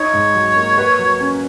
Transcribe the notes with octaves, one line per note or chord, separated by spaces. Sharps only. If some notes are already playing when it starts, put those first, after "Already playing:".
Already playing: D#4 C#5
G#2
F#3
A#3
B4
F#3
C#4